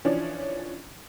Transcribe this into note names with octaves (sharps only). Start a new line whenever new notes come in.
E3 F3 C#4 D4